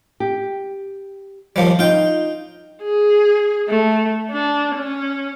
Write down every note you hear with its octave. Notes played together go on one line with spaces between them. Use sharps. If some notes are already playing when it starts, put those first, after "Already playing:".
G4
D#2 F3 G3
D#4 F4 G5
G#4
A3
D4
C#4